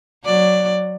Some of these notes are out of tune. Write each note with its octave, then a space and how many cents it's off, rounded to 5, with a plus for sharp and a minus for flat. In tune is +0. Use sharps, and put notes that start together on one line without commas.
F#3 +0 D5 +10